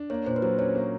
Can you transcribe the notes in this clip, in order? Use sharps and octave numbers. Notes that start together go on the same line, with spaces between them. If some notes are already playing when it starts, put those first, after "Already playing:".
Already playing: D4
A#3 C#5
A#2 C5
B4
F#3 C5
C#4 C#5
A#3